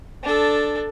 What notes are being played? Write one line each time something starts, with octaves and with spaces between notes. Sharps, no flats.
D4 A4